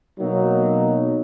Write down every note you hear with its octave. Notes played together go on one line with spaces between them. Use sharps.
B2 F#3 A#3 D#4